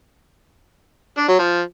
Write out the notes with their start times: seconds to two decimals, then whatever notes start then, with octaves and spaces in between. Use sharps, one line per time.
1.18 D4
1.29 F#3
1.39 F3